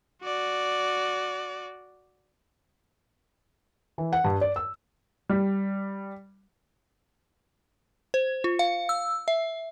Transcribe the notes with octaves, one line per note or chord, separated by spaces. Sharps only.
F#4 D5
E3
F#5
G2
D5
E6
G3
C5
F4
F5
E6
E5